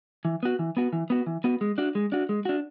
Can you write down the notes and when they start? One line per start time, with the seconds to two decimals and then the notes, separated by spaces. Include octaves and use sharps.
0.25 E3
0.43 B3 F#4
0.59 E3
0.77 B3 F#4
0.93 E3
1.10 B3 F#4
1.27 E3
1.44 B3 F#4
1.61 G#3
1.78 D4 F#4
1.95 G#3
2.12 D4 F#4
2.29 G#3
2.45 D4 F#4